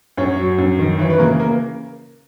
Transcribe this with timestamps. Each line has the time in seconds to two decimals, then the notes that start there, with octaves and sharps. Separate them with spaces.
0.17 F#2 C#4 C#5
0.39 F#3
0.58 F#2
0.79 D#3
0.99 E3 C#5
1.10 B4
1.19 C#3 A#3 A#4
1.40 A#3 A#4